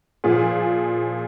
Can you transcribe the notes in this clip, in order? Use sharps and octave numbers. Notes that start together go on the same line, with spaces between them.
A#2 F3 F4 G#4